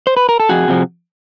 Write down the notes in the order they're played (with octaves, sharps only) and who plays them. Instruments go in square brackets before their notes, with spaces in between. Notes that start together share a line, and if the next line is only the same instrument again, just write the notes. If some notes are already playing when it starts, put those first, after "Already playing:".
[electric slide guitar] C5
B4
A#4
A4
F2 F#4 G#4
C3 F3